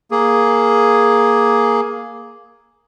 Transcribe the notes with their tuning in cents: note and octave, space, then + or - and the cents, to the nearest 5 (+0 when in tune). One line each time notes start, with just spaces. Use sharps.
A#3 +5 G#4 +0